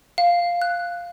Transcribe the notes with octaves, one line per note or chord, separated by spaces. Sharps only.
F5
F#6